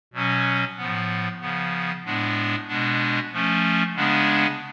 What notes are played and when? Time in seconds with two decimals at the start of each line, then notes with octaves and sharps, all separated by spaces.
0.13 B2 F#3 C#4
0.77 A2 F3 B3
1.41 C#3 F3 B3
2.04 A2 G#3 B3 D4
2.68 B2 G#3 B3 D4
3.32 F3 A3 C#4
3.96 C#3 G#3 B3 D4